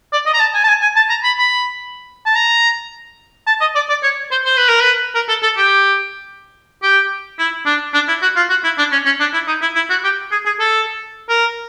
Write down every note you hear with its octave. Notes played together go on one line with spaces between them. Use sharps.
D5
D#5
A#5
A5
G#5
A5
G#5
G#5
A5
A#5
B5
B5
A5
A#5
A5
D#5
D5
D5
C#5
C5
C5
B4
A#4
B4
A#4
A4
A4
G4
G4
E4
D4
D4
E4
F#4
F4
F#4
E4
D4
C#4
C#4
D4
E4
D#4
E4
E4
F#4
G4
G#4
G#4
A4
A#4